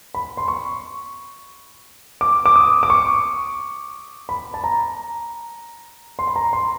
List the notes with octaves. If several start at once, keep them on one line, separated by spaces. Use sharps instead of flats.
B5
C6
C#6
D6
D6
D#6
D6
C#6
B5
A5
A#5
C6
B5
A#5
C6